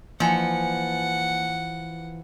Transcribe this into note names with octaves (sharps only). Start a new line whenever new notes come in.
E3 F3 A#3 F#5 G#5 C#7